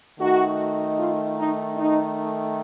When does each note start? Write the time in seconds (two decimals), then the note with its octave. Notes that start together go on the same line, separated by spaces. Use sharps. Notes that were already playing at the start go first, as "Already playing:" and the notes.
0.20 D#3 A3 D#4 F#4
0.98 F4
1.37 D#4
1.76 D#4